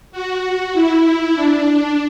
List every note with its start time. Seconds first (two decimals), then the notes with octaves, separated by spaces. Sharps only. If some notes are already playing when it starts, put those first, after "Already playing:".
0.12 F#4
0.74 E4
1.35 D4